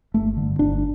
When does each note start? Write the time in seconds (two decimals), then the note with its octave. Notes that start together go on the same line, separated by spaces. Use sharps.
0.14 G1 A3
0.37 G2 D3
0.59 G1 D4